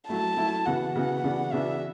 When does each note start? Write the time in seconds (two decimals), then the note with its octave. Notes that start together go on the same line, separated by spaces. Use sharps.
0.08 F#3 A3 E4 A5
0.37 F#3 A3 E4
0.65 C#3 E3 B3 F#4 F#5
0.95 C#3 E3 B3 F#4
1.24 C#3 E3 B3 D4 F#4
1.52 C#3 E3 B3 D4 F#4 E5